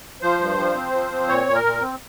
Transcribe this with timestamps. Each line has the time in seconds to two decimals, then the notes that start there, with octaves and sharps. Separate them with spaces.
0.22 F3 C5
0.40 G2
0.57 F3
0.75 C4
0.92 F3
1.11 C4
1.28 A#2 C#5
1.46 A#2
1.55 A#4
1.64 A#2
1.81 C4